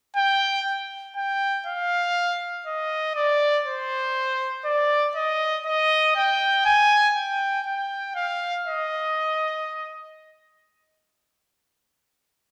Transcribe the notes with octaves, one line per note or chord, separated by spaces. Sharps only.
G5
G5
F5
D#5
D5
C5
D5
D#5
D#5
G5
G#5
G5
G5
F5
D#5